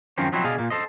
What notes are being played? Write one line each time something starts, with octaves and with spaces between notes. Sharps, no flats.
F#2 D#3 F3 C4 C#4
F3 F#3 C4 D#4 E4
B2 G#4 D5 D#5 F5
A#2 A#3
A4 C5 D#5